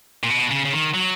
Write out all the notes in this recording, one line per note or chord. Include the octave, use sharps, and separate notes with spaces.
A#2
B2
C#3
C#3
D#3
F#3